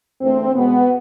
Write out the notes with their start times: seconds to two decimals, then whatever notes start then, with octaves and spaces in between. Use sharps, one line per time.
0.21 E2 D3 A3 C4
0.54 B2 G#3 B3